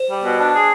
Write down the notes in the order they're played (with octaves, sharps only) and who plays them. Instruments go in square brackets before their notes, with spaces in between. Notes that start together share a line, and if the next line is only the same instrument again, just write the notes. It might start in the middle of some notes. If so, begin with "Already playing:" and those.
Already playing: [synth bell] C5
[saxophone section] G3
B2
D4
G#4